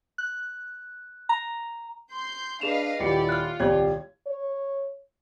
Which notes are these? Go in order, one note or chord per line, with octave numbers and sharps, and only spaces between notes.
F#6
A#5
C6 G6
D4 G#4 B4 D#5 F5 E7 F7
D#1 E4 G4 D5 C#7
F4 F6 F#6
D#1 C2 G4 C#5 G#6
C#5